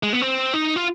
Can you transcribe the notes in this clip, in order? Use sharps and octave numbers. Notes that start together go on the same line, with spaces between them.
G#3
B3
C4
D#4
F4